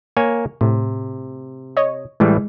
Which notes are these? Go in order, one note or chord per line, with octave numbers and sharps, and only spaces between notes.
A#3 C#5 G#5
A2 C3
C#5 D#5
A2 E3 G3 G#3